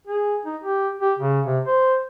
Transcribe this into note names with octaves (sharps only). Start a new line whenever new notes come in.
G#4
D#4
G4
G4
C#3
C3
C5